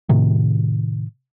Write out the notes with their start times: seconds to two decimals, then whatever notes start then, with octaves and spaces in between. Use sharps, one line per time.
0.09 A2 C3 D#3